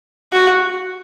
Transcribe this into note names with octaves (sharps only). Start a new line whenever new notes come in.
F#4